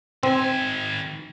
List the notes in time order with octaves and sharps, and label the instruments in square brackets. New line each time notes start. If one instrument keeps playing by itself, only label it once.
[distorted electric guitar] D#3 G#5 [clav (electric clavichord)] C4